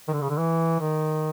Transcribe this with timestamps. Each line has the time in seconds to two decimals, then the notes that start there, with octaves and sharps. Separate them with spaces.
0.08 D#3
0.13 D3
0.21 C#3
0.30 D3
0.38 E3
0.80 D#3